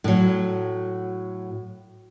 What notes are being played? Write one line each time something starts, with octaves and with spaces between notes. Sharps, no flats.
A2 F#3